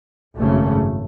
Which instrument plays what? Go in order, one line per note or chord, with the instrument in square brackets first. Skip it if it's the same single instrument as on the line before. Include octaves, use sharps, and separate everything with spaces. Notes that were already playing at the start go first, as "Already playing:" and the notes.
[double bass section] G#1 F#2 C#3 A3